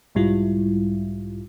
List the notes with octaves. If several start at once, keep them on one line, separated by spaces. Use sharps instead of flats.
B1 G#2 G3 E4 F4